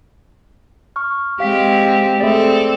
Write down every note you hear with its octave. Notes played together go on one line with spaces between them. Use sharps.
C#6 F6
G#3 C4 G4 F5 B6
A3 C4 G#4 A4 D5